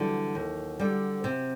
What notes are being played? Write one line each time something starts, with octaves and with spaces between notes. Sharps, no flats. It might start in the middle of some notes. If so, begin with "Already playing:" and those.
Already playing: D3 E3 F#3 G3
D#2
D3 G3
C3